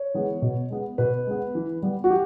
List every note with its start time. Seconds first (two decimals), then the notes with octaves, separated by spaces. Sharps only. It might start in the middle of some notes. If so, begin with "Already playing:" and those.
Already playing: C#5
0.14 E3 G#3 B3
0.42 B2
0.70 G#3 B3
0.98 B2 B4
1.27 G#3 B3
1.55 E3
1.83 G3 B3
2.04 F#4
2.10 E3 G4